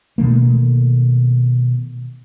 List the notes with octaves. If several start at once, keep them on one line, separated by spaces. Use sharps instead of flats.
B2 D#3 A3 A#3